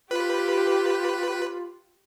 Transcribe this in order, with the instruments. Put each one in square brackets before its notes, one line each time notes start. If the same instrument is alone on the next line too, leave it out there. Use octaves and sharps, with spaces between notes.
[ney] F4 [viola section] G4 [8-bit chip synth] B4